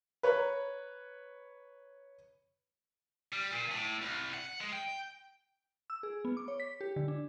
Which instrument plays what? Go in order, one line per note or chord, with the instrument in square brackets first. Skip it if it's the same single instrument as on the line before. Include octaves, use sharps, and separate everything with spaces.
[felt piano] B4 C#5 A#5 B5
[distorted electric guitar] G3
A#2
A2
C2
F#5
G#3
G5
[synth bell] E6
G#4
B3
D6
C#5
B6
G4
D3
D4